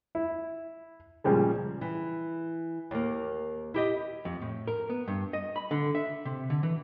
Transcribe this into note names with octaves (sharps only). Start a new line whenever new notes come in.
E4
A#2 C#3 F3 G3 G#3
E3
D#2 A#3
E4 G4 D#5
F2
A2
A#4
B3
G2
D#5
B5
D3
E5
C3
D3
E3